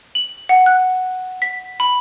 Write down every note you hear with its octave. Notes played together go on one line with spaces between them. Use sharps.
F#7
F#5
F#6
B6
B5